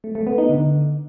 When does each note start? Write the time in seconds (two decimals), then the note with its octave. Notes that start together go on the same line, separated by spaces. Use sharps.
0.04 A3
0.15 A3
0.27 B3
0.38 D#4
0.49 D3